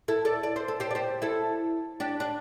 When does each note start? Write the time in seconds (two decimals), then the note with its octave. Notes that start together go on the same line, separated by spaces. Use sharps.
0.08 E4 A4
0.25 A4 D5
0.43 D5
0.56 C5
0.68 A4
0.80 G4 C5
0.91 D5
0.95 G4 C5
1.22 E4 A4
2.00 D4 G4
2.20 D4